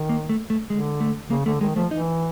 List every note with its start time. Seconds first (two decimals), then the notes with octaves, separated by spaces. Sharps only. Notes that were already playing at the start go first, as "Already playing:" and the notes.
Already playing: D#3
0.09 A#3
0.29 A3
0.50 A3
0.70 D3 G#3
1.01 A3
1.30 C#3 A#3
1.46 D3 A3
1.61 D#3 G#3
1.76 F3 A3
1.91 E3 D#4